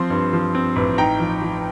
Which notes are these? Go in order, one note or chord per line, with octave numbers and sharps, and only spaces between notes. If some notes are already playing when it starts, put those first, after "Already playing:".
Already playing: F3 C4 C6
G2
F3
C4
A1
D#4 G5 A#5
F3
F3